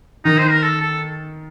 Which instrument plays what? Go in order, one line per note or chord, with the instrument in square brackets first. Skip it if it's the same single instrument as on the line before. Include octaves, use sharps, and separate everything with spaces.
[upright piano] D#3 [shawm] D#4
[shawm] C5
A#4
A4
A4